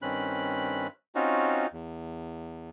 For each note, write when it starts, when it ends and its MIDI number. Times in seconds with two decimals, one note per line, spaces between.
0.02 0.87 43
0.02 0.87 51
0.02 0.87 60
0.02 0.87 61
0.02 0.87 83
0.02 0.87 90
1.15 1.67 60
1.15 1.67 61
1.15 1.67 63
1.15 1.67 65
1.15 1.67 66
1.73 2.70 40